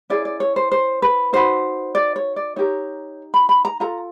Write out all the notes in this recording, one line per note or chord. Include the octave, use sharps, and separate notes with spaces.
C#4 E4 G#4 D5
D5
C#5
C5
C5
B4
D#4 F#4 B4 C5
D5
C#5
D5
D#4 G4 A#4 C#5
B5
B5
A#5
F4 A4 A#5